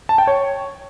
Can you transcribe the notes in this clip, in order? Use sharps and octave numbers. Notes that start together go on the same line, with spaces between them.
A5
G5
C#5